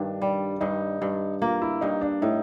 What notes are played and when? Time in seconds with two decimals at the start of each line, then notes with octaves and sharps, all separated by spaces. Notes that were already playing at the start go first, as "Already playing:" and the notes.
Already playing: G2 D#3 D4
0.22 G3
0.61 G2 D#4
1.02 G2
1.42 A#3 F4
1.62 E4
1.81 G2 D#4
2.01 D4
2.22 A2 D#4